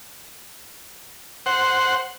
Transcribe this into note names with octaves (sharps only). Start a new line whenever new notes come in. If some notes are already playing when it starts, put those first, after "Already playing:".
C5 F#5